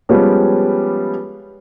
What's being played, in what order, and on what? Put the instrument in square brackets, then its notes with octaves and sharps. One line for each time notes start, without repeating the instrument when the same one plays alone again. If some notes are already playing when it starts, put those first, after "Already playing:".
[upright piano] F3 G3 G#3 B3 C#4 G4